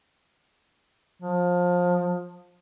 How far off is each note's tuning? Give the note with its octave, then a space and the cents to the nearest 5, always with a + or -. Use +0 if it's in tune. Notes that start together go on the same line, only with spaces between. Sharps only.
F3 +25